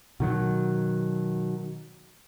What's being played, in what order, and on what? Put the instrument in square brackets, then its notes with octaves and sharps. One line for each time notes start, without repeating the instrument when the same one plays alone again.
[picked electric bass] B2 D#3 F#3